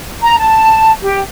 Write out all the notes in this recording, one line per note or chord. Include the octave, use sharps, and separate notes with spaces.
A#5
A5
G4